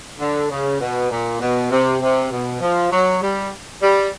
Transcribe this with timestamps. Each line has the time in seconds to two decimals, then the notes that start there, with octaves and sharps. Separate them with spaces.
0.20 D3
0.51 C#3
0.80 B2
1.11 A#2
1.41 B2
1.71 C3
2.01 C3
2.31 B2
2.61 F3
2.91 F#3
3.22 G3
3.82 G3